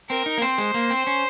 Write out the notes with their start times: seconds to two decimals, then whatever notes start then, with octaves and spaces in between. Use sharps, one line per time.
0.09 C4 A#4
0.26 D#4
0.37 A#3
0.42 C4 C5
0.58 G#3
0.74 A#3
0.90 C4
1.07 C#4